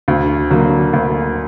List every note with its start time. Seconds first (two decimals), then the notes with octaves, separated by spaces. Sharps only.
0.08 D2
0.50 D3 F#3 A#3
0.93 D2